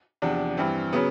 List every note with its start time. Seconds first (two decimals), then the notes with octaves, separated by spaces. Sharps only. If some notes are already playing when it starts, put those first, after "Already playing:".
0.22 E2 C3 F3 D4
0.57 G2 E3 C4
0.93 C#3 F#3 B3